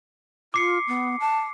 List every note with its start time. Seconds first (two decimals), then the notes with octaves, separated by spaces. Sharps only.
0.54 F4 D6 C7 C#7
0.88 B3
1.20 A5